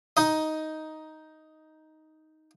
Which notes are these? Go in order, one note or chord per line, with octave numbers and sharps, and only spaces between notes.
D#4 D#5